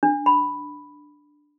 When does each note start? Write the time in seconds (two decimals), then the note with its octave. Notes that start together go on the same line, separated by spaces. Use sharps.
0.03 D4
0.26 B5